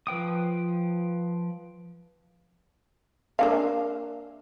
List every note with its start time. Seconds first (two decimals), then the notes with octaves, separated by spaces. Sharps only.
0.07 F3 B4 G5 D#6
3.39 A#3 D4 F5